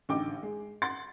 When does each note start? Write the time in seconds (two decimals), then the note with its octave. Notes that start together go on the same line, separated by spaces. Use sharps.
0.09 A1 D3 D#4 G5 D6
0.43 G#3
0.82 F#5 C6 A6